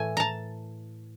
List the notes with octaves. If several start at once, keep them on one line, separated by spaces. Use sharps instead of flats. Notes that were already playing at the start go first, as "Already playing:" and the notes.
Already playing: A2 E3 A3 G#5
A5 A#5